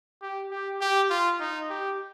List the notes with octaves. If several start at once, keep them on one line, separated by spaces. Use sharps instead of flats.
G4
G4
G4
F4
D#4
G4